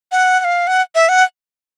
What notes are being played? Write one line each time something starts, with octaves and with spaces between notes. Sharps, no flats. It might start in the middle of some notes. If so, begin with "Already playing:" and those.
F#5
F#5
F5
F#5
E5
F#5